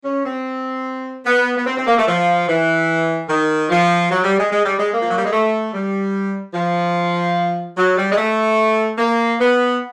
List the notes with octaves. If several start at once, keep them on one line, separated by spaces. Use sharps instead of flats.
C#4
C4
B3
B3
C4
C4
A#3
A3
F3
E3
D#3
F3
F#3
G3
G#3
G#3
G3
G#3
A#3
F3
F#3
G3
G#3
A3
G3
F3
F#3
G3
G#3
A3
A#3
B3